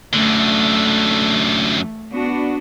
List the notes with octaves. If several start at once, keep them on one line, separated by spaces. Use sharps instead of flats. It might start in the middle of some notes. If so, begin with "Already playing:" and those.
F#2 D3 A3
B3 D4 F#4